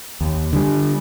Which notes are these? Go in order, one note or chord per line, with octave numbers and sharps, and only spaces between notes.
D#2
D3 G3